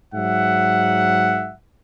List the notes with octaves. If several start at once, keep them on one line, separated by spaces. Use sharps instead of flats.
G#2 F#3 E5 F#5